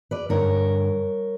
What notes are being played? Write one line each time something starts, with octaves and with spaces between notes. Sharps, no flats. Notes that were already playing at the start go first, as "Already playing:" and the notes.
B4 D5
G2 D3 A#4 C#5